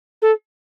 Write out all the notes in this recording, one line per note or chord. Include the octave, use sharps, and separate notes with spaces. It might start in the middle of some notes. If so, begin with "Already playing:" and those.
A4